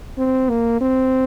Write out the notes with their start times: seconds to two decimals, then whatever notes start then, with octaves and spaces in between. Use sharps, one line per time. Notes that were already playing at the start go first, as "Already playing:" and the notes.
0.18 C4
0.50 A#3
0.81 C4